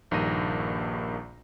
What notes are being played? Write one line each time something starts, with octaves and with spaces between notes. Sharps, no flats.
A#1 G2 D#3 A#3 A#6 D#7